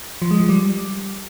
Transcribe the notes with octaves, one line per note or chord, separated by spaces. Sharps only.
F3
G#3
F3
G3